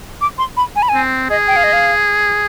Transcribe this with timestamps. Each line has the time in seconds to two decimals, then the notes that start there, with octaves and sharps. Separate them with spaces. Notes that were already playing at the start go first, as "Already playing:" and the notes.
0.21 D6
0.38 C6
0.57 B5
0.76 G#5
0.82 B5
0.89 C4 G#5
1.30 G#4 D#5
1.47 G5
1.56 F5
1.64 D#5
1.73 F5